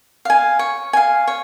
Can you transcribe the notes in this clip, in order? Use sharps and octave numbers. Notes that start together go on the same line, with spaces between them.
F5 G#5
C#5
F5 G#5
C#5